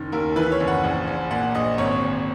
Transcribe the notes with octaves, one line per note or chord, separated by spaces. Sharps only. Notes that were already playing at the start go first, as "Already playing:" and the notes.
Already playing: F#1 D#3
D#2 A#4
E3 B4
C#5
F#1
F#5
A#1
A#1
A#2 F#5
A#1 D#5
G#1 C#5
G#1